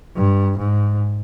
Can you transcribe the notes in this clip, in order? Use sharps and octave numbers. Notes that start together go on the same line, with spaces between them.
G2
G#2